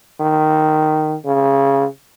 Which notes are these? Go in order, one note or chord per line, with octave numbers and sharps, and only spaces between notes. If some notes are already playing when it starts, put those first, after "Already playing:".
D#3
C#3